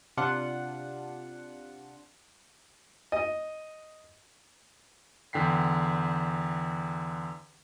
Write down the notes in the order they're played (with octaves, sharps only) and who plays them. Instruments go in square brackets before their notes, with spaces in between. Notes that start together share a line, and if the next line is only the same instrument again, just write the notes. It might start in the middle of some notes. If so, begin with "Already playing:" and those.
[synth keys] C3 D4 F4 F#5
[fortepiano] D#5
[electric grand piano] E2 D3 G5 B6 C7